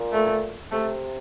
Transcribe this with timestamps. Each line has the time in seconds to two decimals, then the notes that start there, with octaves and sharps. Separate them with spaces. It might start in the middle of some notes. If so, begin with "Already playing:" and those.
Already playing: A#2
0.12 A3
0.72 C3 A3